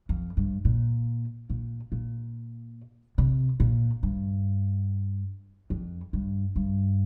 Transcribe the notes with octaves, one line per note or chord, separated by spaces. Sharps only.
F2
G2
A#2
A#2
A#2
C3
A#2
G2
F2
G2
G2